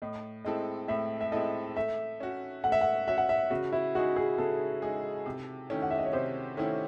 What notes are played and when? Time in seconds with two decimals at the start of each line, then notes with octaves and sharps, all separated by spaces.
0.02 A2 D#5
0.45 G#3 C4 E4 A4 D#5
0.88 A2 E5
1.21 E5
1.32 G#3 C4 E4 A4 D#5
1.76 A3 E5
2.20 C#4 F#4
2.64 A3 F#5
2.72 E5
2.81 F#5
3.07 C#4 F#4 E5
3.18 F#5
3.29 E5
3.50 C#3 F#4
3.72 E4
3.95 G#3 D#4 F#4 G#4
4.16 G#4
4.38 C#3 A4
4.82 G#3 D#4 G#4
5.26 C3
5.70 D#3 A3 C#4 E4
5.82 F#5
5.91 E5
5.98 D#5
6.06 C#5
6.13 C3 C5
6.57 D#3 A3 C#4 E4 C#5